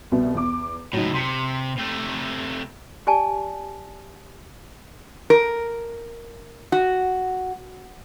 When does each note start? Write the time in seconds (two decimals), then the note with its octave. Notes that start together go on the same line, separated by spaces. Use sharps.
0.12 C2 B2
0.35 E2 D6
0.93 C#2 A2 F#3 D#4
1.14 C3 C6 B6 C#7
1.78 C3 A3
3.07 G4 D5 G#5 A5
5.30 A#4
6.72 F#4